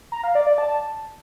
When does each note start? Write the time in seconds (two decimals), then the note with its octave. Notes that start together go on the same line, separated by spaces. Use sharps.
0.12 A#5
0.24 F5
0.35 D5
0.47 D5
0.58 A5